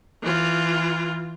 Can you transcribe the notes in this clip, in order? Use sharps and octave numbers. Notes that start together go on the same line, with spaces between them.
E3 F4